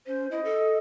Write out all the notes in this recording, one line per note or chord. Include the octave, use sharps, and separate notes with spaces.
C#4 C5
E4 D#5
A4